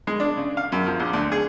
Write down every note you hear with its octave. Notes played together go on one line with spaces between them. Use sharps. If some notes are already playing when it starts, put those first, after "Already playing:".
G#3
D4
C#3
F5
F#2
F3
A#1
D2
G#4